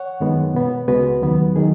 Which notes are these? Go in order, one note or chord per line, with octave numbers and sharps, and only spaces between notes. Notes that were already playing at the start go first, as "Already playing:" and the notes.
Already playing: C#5 F#5
F#2 D#3 G#3 B3
B2 B3
C#2 C#3 G#3 B3 F#4 B4
D#2 D#3 F#3 B3
D#3 F#3 G#4